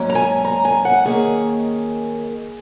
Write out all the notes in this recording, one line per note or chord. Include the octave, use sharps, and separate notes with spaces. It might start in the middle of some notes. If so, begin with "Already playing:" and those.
Already playing: G#2 F#3 A#3 C#4
A#5
G#5
A#5
G#5
F#5
D#2 D#3 A#3 C#4 G#4